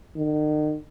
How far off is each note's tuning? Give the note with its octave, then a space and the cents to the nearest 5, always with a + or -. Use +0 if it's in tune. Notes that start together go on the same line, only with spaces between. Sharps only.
D#3 -40